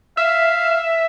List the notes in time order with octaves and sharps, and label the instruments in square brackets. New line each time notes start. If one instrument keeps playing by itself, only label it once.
[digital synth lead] E5 [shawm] F5